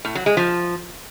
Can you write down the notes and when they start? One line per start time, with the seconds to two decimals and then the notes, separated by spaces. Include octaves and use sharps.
0.05 A2
0.15 F#3
0.26 G#3
0.37 F3